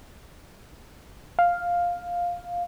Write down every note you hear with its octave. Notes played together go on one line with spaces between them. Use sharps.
F5